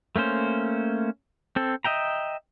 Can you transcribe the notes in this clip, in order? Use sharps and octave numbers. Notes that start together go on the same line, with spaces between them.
A3 A#3 C#4 C5
C4 A4
D#5 E5 G5 A#5